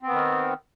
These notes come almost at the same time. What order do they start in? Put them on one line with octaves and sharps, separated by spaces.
C4 B3 D#3